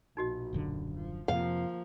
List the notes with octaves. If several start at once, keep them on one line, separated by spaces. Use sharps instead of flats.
A#1 B2 D#4 F#4 D#5
D#1 F#2 D3
F3
F2 C3 F3 A#3 F5